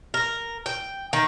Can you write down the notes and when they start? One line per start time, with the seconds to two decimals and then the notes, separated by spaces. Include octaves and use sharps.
0.14 A#4
0.66 G5
1.13 D#3